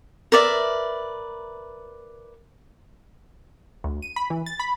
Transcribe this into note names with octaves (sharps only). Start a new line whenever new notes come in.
A#4 B4 D5 E5
D2
D#7
B5
E3
A6
B5